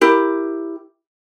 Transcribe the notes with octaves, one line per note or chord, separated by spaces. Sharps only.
E4 G4 A#4